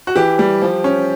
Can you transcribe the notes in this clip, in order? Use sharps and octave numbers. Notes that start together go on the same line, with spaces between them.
F#4
E3 G4
G3
F3
C#4